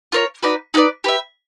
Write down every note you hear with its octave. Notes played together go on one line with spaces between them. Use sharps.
F4 A#4 C#5
D#4 F#4 B4 D5
D#4 F#4 B4 D5
G4 B4 E5